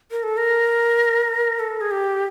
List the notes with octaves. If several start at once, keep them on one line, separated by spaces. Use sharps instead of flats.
A#4
A4
A#4
A4
G#4
G4